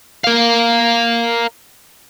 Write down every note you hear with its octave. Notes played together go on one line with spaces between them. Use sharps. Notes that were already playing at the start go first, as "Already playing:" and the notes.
A#4 F5